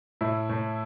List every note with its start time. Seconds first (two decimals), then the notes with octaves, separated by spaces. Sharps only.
0.21 A2 E4
0.49 A2